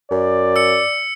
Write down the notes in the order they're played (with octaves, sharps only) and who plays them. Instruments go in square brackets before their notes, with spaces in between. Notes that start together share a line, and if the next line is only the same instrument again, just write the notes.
[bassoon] F#2 [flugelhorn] D5
[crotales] E6 C#7